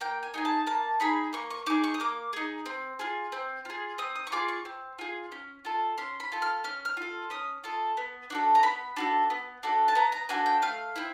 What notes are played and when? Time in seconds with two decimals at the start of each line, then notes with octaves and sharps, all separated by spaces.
0.01 A#3 G5
0.23 G#5
0.34 D#4 G#4 G#5
0.45 A5
0.67 A#3 A5
1.00 D#4 G#4 B5
1.33 A#3 C#6
1.50 C#6
1.66 D#4 G#4 D6
1.84 C#6
1.94 D#6
2.00 A#3 D6
2.33 D#4 G#4
2.66 C4
2.99 F4 G#4
3.32 C4
3.65 F4 G#4
3.98 C4 D#6
4.16 D#6
4.27 C#6
4.32 F4 G#4 D6
4.48 C#6
4.65 C4
4.99 F4 G#4
5.32 C#4
5.65 F4 A4
5.98 C#4 C6
6.20 B5
6.32 F4 A4
6.42 F6
6.64 C#4 F6
6.85 F6
6.97 F4 A4
7.30 C#4 D#6
7.64 F4 A4
7.97 B3
8.30 D4 F#4 A4
8.55 A#5
8.63 B3 B5
8.96 D4 F#4 A4
9.30 B3
9.63 D4 F#4 A4
9.88 A5
9.95 B3 A#5
10.12 A#5
10.29 D4 F#4 A4 G#5
10.46 G5
10.62 A3 F5
10.96 C4 E4